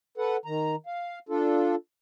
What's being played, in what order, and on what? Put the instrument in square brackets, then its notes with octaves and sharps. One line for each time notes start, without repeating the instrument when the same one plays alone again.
[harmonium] A4 B4 F#5
D#3 A#5
F5
D4 F4 A4